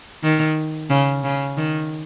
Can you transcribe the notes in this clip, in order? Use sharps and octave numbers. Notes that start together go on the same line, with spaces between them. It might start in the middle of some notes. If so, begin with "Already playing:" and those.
D#3
C#3
C#3
D#3